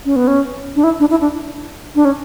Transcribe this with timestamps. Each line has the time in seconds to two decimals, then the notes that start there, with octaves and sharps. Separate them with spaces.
0.05 C#4
0.16 B3
0.27 C#4
0.76 D4
0.84 E4
1.00 D4
1.10 E4
1.21 D4
1.95 D4
2.05 C#4